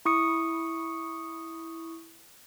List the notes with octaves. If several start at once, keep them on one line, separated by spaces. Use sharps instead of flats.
E4 C#6 D#6 C#7